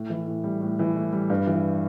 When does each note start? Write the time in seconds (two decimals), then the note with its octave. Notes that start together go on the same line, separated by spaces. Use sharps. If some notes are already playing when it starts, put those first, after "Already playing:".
Already playing: A2
0.10 E3
0.27 A2
0.44 G3
0.61 A2
0.79 E3
0.96 A2
1.13 G3
1.30 G2
1.47 E3